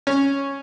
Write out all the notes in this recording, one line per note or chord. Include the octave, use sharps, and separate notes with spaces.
C#4